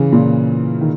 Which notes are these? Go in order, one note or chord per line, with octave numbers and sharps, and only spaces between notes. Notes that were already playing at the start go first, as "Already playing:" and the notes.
Already playing: C#3 E3
A#2
D#3